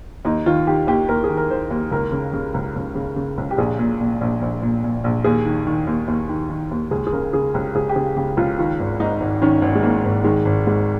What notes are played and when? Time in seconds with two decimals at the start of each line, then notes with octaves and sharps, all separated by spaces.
0.25 D#2 D#4
0.46 D#3 F4
0.67 D#3 G4
0.87 D#2 G4
1.09 D#2 A#4
1.24 G#4
1.30 D#3
1.37 A#4
1.50 D#3 C5
1.71 D#2
1.91 C#2 A#4
2.12 C#3
2.33 C#3
2.54 C#2
2.76 C#2
2.95 C#3
3.16 C#3
3.38 C#2
3.51 G4
3.58 A#1 G#4
3.79 A#2
4.01 A#2
4.21 A#1
4.42 A#1
4.62 A#2
4.84 A#2
5.04 A#1
5.24 D#2 G#4
5.46 D#3
5.67 D#3
5.87 D#2
6.08 D#2
6.29 D#3
6.50 D#3
6.71 D#2
6.91 C#2 G#4
7.07 G#4
7.12 C#3 A#4
7.33 C#3 G#4
7.54 C#2 G4
7.75 C#2 G#4
7.89 G4
7.96 C#3 G#4
8.16 C#3 G4
8.37 C#2 F4
8.58 D#3 F4
8.80 G#1
9.00 G#2 D#4
9.20 G#1
9.42 D#3 C#4
9.62 G#1
9.75 G#3
9.83 G#2 A#3
10.05 G#1
10.24 D#3 G#3
10.45 G#1
10.66 G#2 G#3